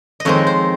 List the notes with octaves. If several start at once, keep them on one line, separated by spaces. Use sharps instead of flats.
D#5
F2 D#3 G#3 C4 C#5
C5